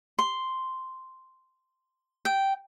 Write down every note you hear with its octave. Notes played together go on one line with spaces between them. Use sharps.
C6
G5